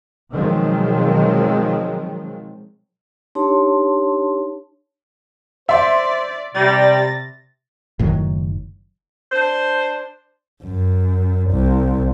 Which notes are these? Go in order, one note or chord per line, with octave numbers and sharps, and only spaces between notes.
B2 D#3 F3 F#3 G#3 C4
D4 D#4 G4 C#5 A5 C6
C5 D5 E5 C6
C3 G3 A6 A#6
F#1 A2 D#3 F#3
D4 C5
F#2
C2